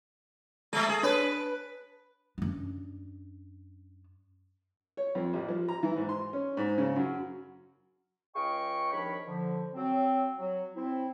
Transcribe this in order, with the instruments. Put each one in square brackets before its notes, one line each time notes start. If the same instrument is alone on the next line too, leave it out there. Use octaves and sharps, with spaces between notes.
[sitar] G#3 A3 [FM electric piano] A4 E5
[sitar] G#4 [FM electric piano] A4
[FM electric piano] D4 C#5 A5 [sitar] B4
[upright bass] F#2 D4
[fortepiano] C#5
F2
A1
F3
A#5
E3
G#2
C6
C#4
G#2
C#3
F#2
[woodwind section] C#2 G#4 D#5 F5 G5 C#6
C2 D#3 F3 D4 C#5 B5
D3 F3
F#3 C4
F#3
C4 E4